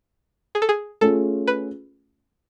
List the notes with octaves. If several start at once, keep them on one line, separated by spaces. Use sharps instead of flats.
G#4
A4
G#4
A3 C#4 F4 G#4 A4
B4